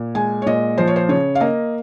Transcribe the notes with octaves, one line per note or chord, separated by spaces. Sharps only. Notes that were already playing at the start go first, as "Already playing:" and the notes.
Already playing: A#2
G#3 G#5
C#5
A#2 D#5
F3 C5
C#5
C5
C#3 C#5
F5
A#3 D#5